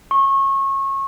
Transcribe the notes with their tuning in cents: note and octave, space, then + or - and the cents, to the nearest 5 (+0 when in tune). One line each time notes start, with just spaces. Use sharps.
C#6 -25